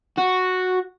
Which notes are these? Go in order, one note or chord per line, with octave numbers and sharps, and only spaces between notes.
F#4